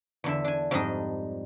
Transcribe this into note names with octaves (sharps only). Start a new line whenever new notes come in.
E2 D3 E5
D4 G#5
F2 G#2 G3 D4 D#4 D#5